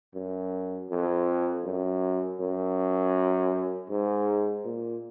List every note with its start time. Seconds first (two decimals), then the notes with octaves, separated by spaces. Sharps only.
0.14 F#2
0.90 F2
1.64 F#2
2.40 F#2
3.90 G#2
4.65 A#2